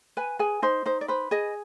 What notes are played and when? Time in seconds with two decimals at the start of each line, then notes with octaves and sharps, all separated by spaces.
0.17 B4 G#5
0.39 G#4 G#5
0.62 D#4 C5
0.86 D#4 C5
1.01 D5
1.08 B4 C5
1.31 G#4 D#5